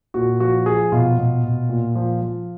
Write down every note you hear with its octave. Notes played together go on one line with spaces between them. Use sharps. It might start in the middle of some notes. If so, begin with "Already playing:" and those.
A#2 F#4
F3 F#4
F3 G#4
B2 F4
B2
B2
A#2
F3
F3